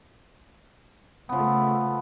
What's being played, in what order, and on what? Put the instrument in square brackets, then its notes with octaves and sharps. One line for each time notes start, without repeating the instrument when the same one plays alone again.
[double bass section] C#3 A3 [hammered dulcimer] F3 B3